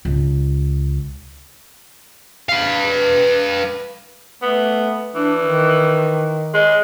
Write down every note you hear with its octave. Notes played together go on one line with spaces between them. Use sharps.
C#2
B4 F5
A3 B3
E3 D4
D#3
G#3